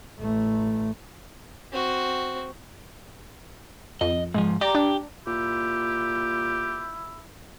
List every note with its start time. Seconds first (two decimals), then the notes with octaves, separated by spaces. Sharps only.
0.20 A1 A3
1.72 C4 F#4
4.01 F2 D#5
4.34 G#2 F3 G#3
4.61 G4 D5 A#5
4.75 D4
5.27 A#2 E4 G4